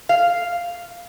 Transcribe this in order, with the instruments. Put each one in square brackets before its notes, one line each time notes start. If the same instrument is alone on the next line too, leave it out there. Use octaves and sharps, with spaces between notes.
[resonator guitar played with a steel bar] F5